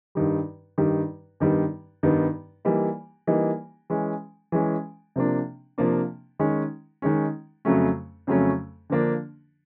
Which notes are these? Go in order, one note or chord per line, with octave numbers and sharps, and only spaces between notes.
G2 D#3 G3
G2 D#3 G3
G2 D#3 G3 B3
G2 D#3 G3 B3
E3 G3 A#3 D#4
E3 G3 A#3 D#4
E3 G#3 C#4
E3 G#3 C#4
C3 F3 A#3 D4
C3 F3 A#3 D4
D#3 G#3 C#4
D#3 G#3 C#4
F2 C#3 F#3 A3 C#4
F2 C#3 F#3 A3 C#4
D3 F3 A#3 D4